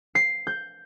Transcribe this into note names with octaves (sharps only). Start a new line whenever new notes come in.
C7
G6